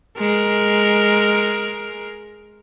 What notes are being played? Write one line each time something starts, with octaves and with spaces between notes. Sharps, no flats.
G#3 A#4